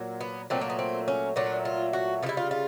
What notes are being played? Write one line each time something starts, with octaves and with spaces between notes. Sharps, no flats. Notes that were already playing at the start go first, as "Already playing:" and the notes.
Already playing: A#2 F#3
B3
A#2 F#3 A3 C4
A#3
B3
C4
C#4
A#2 F#3 A3 D4
F4
F#4
C#3 E3 G3 E4 F4
F4
F4